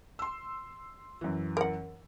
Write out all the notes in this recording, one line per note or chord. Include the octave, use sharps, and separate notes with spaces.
C6 E6
F#2 E3
A#4 F#5